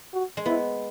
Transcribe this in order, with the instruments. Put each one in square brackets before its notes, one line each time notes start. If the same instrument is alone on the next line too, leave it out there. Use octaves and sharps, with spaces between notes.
[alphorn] F#4
[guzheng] G#3
[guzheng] B3 [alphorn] E4